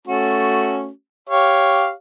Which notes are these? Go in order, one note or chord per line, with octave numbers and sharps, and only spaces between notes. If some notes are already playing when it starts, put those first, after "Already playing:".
A3 C#4 F#4
G4 C#5 F5